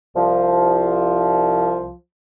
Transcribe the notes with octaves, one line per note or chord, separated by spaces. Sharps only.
C2 F3